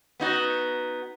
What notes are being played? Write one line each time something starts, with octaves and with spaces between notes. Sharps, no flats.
B3 D#4 F#4